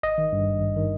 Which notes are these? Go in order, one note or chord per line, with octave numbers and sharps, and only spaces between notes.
G#1 D#5
D#3
G2
G#1
G#1
D#3